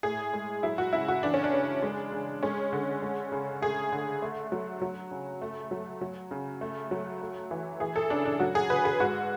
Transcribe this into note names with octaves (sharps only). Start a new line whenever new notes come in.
A2 G#4
G#3
F#3 E4
F#4
C#3 E4
F#4
E3 D4
C#4
D4
C#3
G#3
C#3
G#3 C#4
D3
G#3
C#3
A3 G#4
D3
A3
F#3
F#3
C#3
A3
F#3
F#3
C#3
A3
F#3
A3
E3
E3 G#4
A4
C#3 D4
D4
F#3 F#4
G#4
D3 B4
G#4
G#2 F#4